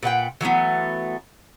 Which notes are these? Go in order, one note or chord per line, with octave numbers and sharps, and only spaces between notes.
A#2 B4 F#5 G5
E3 F#3 A3 B3